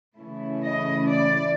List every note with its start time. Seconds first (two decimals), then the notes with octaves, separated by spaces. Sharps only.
0.18 C#3 E3 A3 C#4 E4
0.62 D#5
1.06 D5